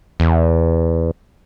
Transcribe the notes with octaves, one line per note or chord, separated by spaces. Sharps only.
E2